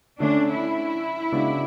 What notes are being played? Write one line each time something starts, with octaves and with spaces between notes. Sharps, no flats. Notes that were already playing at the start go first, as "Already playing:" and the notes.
D3 A3 C#4 D4
E4
C#3 G#3 B3 D4 F#4